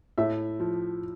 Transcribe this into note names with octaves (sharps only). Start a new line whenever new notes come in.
A2 E5
F3